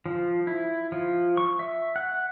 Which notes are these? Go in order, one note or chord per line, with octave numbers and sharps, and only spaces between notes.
F3
E4
F3
C#6
E5
F#5